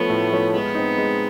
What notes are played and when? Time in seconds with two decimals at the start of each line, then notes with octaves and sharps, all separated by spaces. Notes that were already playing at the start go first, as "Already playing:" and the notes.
Already playing: F3 A3 B3 C#4
0.09 A2
0.32 F3 A3 C#4
0.53 G#3 B3
0.75 C4 D#4
0.98 G#3